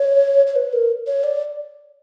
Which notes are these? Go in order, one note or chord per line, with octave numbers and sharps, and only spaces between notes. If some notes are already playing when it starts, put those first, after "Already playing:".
Already playing: C#5
C#5
B4
A#4
C#5
D5